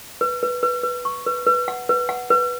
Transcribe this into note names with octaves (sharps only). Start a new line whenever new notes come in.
B4
B4
B4
B4
C#6
B4
B4
F#5
B4
F#5
B4